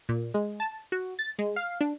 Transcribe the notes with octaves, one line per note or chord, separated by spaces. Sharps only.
A#2
G#3
A5
F#4
A6
G#3
F5
D4